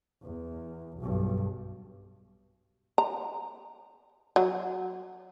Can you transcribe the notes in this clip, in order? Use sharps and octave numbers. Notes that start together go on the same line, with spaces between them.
E2
B1 G2
A#5
F#3